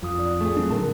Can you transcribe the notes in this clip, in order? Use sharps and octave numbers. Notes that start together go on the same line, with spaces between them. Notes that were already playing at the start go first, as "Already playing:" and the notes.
F2 F4 D#6
D4
A3 G#4
F#3 C4 D4
A#2 D3 F#3 A#4 A5